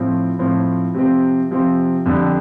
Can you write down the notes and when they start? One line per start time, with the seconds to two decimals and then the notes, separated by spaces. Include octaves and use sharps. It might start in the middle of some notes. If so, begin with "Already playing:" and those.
Already playing: A2 F3 C4
0.39 A2 F3 C4
0.94 C3 F3 C4
1.51 C3 F3 C4
2.06 F2 D3 G3 D4